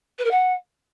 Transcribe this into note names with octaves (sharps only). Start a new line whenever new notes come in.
B4
A#4
F#5